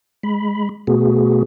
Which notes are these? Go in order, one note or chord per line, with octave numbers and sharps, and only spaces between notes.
G#3 B5
B2 A3 B3 F#4 G#4